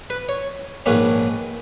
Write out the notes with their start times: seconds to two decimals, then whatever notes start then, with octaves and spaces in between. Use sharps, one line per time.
0.10 B4
0.29 C#5
0.86 A#1 G#2 D#3 A#3 C#4 B4